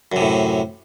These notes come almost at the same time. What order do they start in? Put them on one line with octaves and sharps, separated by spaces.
F#2 C3 A2